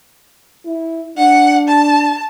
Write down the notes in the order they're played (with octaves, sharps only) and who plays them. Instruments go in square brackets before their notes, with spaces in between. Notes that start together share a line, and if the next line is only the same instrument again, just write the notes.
[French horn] E4
[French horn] D4 [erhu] F#5
[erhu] A5